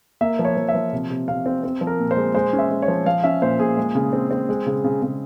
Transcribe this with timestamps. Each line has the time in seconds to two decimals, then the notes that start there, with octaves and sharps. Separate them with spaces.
0.21 A#3 E5
0.39 F3
0.45 C#5
0.57 F3
0.68 E5
0.74 F3
0.92 C3
1.10 C3
1.28 C3 F5
1.46 C4
1.64 C4
1.81 F3
1.87 A#4
1.99 A#2
2.11 C5
2.17 G#3
2.35 G#3 C5
2.53 C#4
2.59 E5
2.70 G#3
2.82 C#5
2.88 F3
3.06 F3 F5
3.24 C#4 E5
3.41 A#2 C5
3.59 A#2 G#4
3.77 G#3
3.95 C#3
4.13 C4
4.31 C4
4.49 G#3
4.66 C#3
4.84 C#3
5.02 C#3